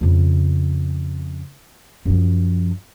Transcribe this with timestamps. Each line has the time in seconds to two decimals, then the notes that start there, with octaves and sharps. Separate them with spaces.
0.01 F2 C#3
2.05 F#2 F3